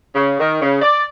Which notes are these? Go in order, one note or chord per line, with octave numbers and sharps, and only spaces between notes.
C#3
D#3
C#3
D5